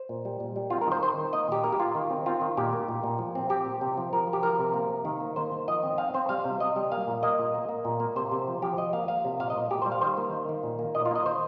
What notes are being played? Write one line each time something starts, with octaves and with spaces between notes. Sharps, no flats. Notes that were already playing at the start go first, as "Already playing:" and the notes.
Already playing: C5
A#2
G3
A#2
G3
C4 F4
A#4
D#3 C5
C4 C5
D#3
A#3 D#5
A#2 G4
A#3 A#4
G4
A#3 F4
D#3
C4
C4 F4
D#3
A#2 G4
A#3
A#2
A#2
F3
C4
C4 G4
A#2
C3
F3
F3 A#4
F3
G4
F3 A#4
C3
A#3
C3
D#3
A#3
A#3 C5
D#3
F3 D#5
C4
C4 F5
C4 C5
G3 F5
C3
C3 D#5
G3
A#3 F5
A#2
A#3 D#5
A#2
A#3
A#3
A#2
A#3
C3 C5
C3
F3
F3 G4
F3 D#5
A#3 F5
A#3 F5
C3
A#2 F5
D#5
A#2
A#2 G4
C5
G3
F5
D#3 C5
A#3
D#3
D#3
A#2
A#3
A#2 D#5
F4
A#3 D#5
D#3 C5